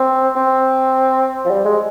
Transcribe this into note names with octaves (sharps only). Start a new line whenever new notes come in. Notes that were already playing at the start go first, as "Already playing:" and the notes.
Already playing: C4
C4
F3
G3
G#3